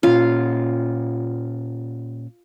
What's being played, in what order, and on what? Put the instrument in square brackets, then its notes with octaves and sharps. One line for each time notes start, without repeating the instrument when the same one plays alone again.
[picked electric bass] A#2 C#4 [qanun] F4